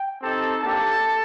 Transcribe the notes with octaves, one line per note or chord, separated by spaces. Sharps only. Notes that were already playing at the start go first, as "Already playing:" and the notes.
Already playing: G5
C4 D#4 G4 A4 A5
A#3 D4 G4 A4 A5